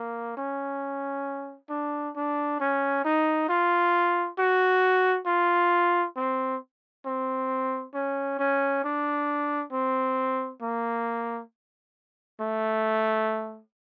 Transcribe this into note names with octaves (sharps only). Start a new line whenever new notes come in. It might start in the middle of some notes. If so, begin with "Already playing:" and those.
Already playing: A#3
C#4
D4
D4
C#4
D#4
F4
F#4
F4
C4
C4
C#4
C#4
D4
C4
A#3
A3